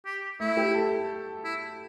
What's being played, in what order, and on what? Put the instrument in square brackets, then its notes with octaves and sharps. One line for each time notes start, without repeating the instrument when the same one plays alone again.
[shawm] G4
[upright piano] A3 [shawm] E4
[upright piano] G4
A4
[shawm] E4